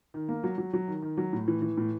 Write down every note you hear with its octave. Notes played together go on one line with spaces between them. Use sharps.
D#3
A#3
F#3
F#3
F#3
D#3
D#3
F#3
A2
E3
E3
A2